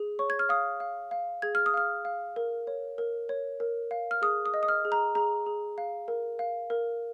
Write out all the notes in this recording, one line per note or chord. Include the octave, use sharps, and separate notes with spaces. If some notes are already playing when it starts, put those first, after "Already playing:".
Already playing: G#4
C#5 C#6
G#6
F6
F5 D#6
F5
F5
G#4 G#6
F6
D#6
F5 F6
F5
A#4
C#5
A#4
C#5
A#4
F5
F6
G#4 D#6
D#6
D#5
D#6
F6
G#4
A#5
G#4 A#5
G#4
F5
A#4
F5
A#4